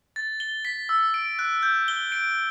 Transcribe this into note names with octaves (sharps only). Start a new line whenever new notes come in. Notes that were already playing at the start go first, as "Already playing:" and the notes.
A6
G7
B6
E6
D7
F#6
G6
G7
D7